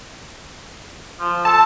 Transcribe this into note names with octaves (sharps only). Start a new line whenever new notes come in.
F3
A4 A5